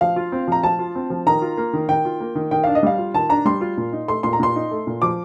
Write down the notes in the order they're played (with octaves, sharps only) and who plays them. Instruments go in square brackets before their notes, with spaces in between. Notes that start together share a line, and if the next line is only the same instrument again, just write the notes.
[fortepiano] F3 [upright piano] F5
[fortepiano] F4
C4
[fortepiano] F3 [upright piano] A#5
[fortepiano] F3 [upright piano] A5
[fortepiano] F4
C4
F3
[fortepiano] D#3 [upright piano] A#5
[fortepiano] F4
A#3
D#3
[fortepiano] D#3 [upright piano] G5
[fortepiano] F4
A#3
D#3
[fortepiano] D#3 [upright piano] G5
[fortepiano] D4 [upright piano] F5
[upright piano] D#5
[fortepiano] G3 [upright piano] F5
[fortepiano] F4
[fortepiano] D#3 [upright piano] A5
[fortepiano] D4 [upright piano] A#5
[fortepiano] G3 [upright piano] C6
[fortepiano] F4
A#2
D#4
[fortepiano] A3 [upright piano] C6
[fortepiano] A#2 [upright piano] C6
[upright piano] A#5
[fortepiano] A#2 [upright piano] C6
[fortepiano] D#4
A3
A#2
[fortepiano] F3 [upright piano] D6